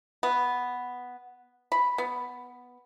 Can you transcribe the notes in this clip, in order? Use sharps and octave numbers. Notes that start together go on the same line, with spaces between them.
B3
B5
B3